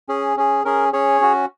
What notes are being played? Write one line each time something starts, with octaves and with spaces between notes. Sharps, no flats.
C#4 G#4
C#4 G#4
C#4 G#4 A#4
C#4 G#4 C#5
C#4 F#4